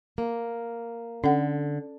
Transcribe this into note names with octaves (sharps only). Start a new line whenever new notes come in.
A#3
D3 C#4 A4 F#5